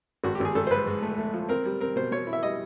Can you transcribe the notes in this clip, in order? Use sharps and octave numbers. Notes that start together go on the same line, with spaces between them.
G#1 F#4
G4
G#1 G#4
G#1 A4
C5
G#2 B4
G#2
A3
A3
F3
C4 A#4
G3
C4 A#4
B2 C5
B2 C#5
E4
E5
G3 D#5